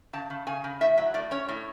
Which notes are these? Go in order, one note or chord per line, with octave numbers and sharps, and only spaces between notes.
C#3 A5
C#3
C#3 G#5
C#3
A2 E5
F#3 E5
A2 D5
C#4 C#5
A2